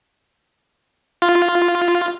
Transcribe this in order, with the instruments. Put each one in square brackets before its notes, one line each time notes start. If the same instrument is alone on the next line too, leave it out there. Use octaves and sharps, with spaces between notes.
[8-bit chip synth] F4